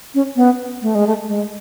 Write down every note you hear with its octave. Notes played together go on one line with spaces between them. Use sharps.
C#4
B3
A3
G#3
A3
G#3